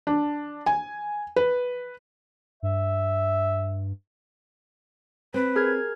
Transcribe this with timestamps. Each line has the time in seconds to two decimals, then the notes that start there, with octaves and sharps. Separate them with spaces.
0.07 D4
0.66 G#5
1.36 B4
2.63 G2 E5
5.34 C4 B4
5.56 G#4 A#4 F6 G#6